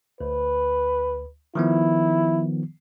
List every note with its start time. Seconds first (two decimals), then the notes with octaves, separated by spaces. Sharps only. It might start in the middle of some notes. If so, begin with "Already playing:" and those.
0.21 D2 B4
1.55 D#3 F3 B3 E4